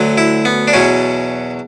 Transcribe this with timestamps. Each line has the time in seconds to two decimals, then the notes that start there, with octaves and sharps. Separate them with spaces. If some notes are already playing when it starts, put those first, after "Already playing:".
Already playing: D2 D3 F#3
0.18 E4
0.45 B3
0.68 D4
0.73 E2 B2 F#3 C#4